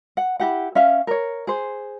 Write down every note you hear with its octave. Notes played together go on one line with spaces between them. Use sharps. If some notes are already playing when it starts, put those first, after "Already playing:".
F#5
E4 G4 F#5
C#4 E5 F5
A#4 C#5
G#4 C5